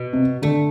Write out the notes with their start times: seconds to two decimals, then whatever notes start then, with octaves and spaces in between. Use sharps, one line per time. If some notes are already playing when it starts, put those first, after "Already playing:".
Already playing: B2
0.13 C3
0.42 D3 A3